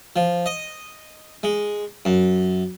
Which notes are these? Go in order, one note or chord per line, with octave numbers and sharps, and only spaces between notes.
F3
D#5
G#3
F#2